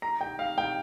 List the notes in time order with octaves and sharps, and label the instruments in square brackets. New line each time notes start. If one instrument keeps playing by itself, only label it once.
[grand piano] A#5
G5
F5
G5